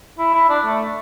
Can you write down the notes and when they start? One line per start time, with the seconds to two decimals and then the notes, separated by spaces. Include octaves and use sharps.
0.18 E4
0.34 E4
0.49 D4
0.65 A3